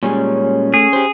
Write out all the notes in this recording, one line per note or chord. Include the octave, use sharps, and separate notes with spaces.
A#2 G3 G#3 C#4
A3 G#4
G4 C5